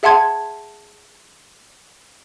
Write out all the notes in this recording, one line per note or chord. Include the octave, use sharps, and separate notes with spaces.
G#4 E5 F#5 A5 C6 G#6